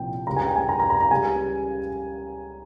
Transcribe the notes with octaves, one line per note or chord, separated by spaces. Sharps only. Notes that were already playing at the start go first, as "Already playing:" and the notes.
Already playing: C2 A#2 F3 G5
C#2 C#3 G3 A#5
G#5
G5
G#5
A#5
A#5
A#5
A#5
C#2 C#3 G3 G#5